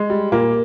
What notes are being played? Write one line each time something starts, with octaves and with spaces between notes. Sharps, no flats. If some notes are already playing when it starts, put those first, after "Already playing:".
Already playing: G#3
G3
A#2 A#3